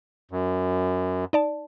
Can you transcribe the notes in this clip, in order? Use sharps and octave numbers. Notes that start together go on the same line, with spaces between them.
F#2
D#4 D5 A5